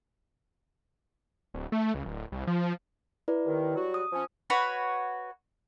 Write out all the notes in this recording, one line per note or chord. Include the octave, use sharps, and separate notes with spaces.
D1
A3
C#2
D1
C2
F3
E4 B4 D5
D#2 D#3
F#3 G3 F#4
D#6
F3 C#4
F#4 B4 C#5 B5